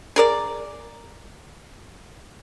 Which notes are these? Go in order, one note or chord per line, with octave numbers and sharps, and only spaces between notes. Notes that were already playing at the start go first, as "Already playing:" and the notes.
G#4 A#4 D5